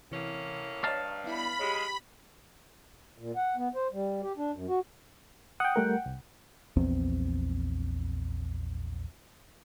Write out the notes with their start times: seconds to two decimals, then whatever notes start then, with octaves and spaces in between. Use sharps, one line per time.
0.11 A2 C3 E3 A#3 C#4
0.84 G2 C#5 D#5 F5 A5 A#5
1.24 B3 E4 B5
1.59 G#3 G4 C#5
3.18 A#2
3.36 F#5
3.56 B3
3.75 C5
3.92 G3
4.23 G4
4.38 D4
4.53 F#2
4.68 F#4
5.60 F#5 G5 D#6
5.76 G3 A3 A#4
6.06 C2
6.76 A#1 E2 C4